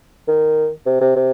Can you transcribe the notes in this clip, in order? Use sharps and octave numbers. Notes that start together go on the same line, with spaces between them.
D#3
C3
C3
C3